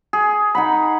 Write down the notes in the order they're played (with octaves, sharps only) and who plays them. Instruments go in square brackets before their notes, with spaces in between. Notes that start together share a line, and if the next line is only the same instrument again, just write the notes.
[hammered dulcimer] G#4
D#4 F#5 B5